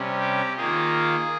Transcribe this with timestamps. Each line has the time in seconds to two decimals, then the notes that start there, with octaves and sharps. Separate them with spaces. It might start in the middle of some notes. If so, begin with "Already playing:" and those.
Already playing: C3 G3 C#4
0.19 G4
0.57 D#3 A#3 F4 G#4